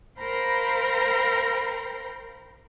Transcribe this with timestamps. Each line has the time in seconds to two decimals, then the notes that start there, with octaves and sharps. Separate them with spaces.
0.20 A#4 C5 F5 G5 A#5 B5